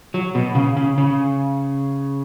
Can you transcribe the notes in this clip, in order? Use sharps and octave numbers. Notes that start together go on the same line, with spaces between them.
F#3
B2
C#3
C#3
C#3